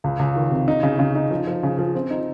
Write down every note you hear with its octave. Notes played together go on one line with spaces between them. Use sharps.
C#2
C#2
D#3
C3
D#4
C#3
C#3
D#4
F3
F3
C#3
F3
C4
D#4